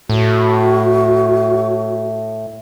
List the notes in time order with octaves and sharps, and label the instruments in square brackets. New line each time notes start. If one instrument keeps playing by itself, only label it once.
[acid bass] A2 [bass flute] F#4